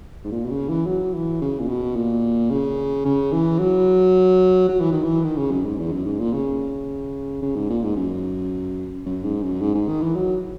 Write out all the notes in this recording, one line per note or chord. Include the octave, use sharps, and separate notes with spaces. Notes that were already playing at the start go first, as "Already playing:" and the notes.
G#2
A#2
B2
C#3
E3
F#3
E3
C#3
A#2
B2
A#2
C#3
C#3
E3
F#3
F#3
E3
D#3
E3
D#3
C#3
F#2
G#2
E2
F#2
G#2
A#2
C#3
C#3
G#2
A#2
G#2
F#2
F#2
G#2
F#2
G#2
G#2
D#3
E3
F#3